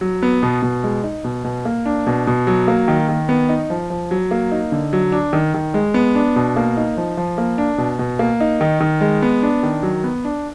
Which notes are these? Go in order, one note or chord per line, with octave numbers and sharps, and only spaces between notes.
F#3
B3
B2
B2
G#3
D#4
B2
B2
A#3
D4
B2
B2
F#3
A#3
D#3
D#3
B3
D#4
F3
F3
F#3
A#3
D#4
D3
F#3
D4
D#3
D#3
G#3
B3
D4
B2
A#3
D#4
F3
F3
A#3
D4
B2
B2
A#3
D#4
D#3
D#3
G#3
B3
D4
D#3
F#3
B3
D4